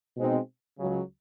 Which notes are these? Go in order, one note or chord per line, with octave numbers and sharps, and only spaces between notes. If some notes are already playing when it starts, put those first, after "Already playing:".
B2 G#3 C4 D#4
C#2 C#3 F#3